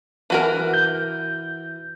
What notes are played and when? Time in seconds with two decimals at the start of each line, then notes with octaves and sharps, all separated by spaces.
0.30 E3 F#4 A#4
0.74 G6